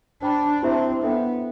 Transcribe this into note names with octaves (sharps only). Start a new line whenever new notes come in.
D4 C5 G5 B5
C4 E4 G4 C5 E5 A5
B3 D4 A4 E5 G5